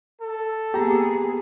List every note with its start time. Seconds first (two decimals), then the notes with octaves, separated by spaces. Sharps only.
0.21 A4
0.74 A#3 B3 G4 G#4 A#5